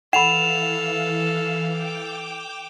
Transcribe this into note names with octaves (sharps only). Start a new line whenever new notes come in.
E3 A4 F5 F#5 B5 E7 F7
G5 D6